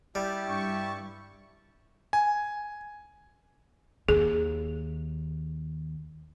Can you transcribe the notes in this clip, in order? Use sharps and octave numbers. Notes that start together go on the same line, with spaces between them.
G3 E4 G4 A5
G2 C#6
G#5
D#2 G#4